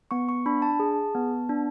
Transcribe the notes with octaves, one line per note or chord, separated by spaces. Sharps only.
B3 C#6
C#6
D4 B5
A5
G#4
B3
D4